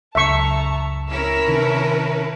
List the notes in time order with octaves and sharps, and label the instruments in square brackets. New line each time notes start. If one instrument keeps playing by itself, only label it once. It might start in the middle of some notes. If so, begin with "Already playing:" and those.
[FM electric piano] C#2 F#2 C#3 [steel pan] E5 C#6 [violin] A5 A#5
[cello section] C#4 E4 A#4 [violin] E6
[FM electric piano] C3 D#3 [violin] A4 B4